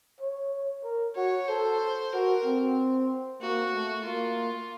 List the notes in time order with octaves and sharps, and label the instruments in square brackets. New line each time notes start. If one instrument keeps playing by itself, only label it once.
[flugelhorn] C#5
A#4
[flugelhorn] F#4 [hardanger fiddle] C#5
[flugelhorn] A4 [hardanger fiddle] C5
[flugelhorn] F#4 [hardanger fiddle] A#4
[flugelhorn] C4
[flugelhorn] A#3 [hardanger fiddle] F#4
[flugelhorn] A3
[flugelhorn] A#3 [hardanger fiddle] F4